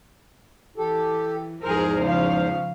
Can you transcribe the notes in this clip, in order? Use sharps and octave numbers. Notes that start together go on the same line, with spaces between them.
E3 G4 A4
E2 G#2 F3 G#4 A#4 C5
C#3 F3 C#4 F5